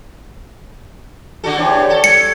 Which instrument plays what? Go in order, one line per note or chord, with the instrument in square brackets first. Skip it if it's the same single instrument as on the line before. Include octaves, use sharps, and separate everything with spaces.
[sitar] D3 F#4 A4
[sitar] E2 D4 [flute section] G4 C#5
[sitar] A4
[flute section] G#6 [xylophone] C#7